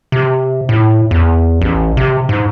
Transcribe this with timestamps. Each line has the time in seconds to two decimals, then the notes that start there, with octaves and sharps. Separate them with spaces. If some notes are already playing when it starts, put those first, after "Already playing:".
0.12 C3
0.69 A2
1.11 E2
1.61 A1
1.97 C3
2.29 G#2